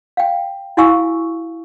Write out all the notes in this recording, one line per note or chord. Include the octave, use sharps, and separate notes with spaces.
F5 G5
E4 F#4 F5 G#5 C#6 E6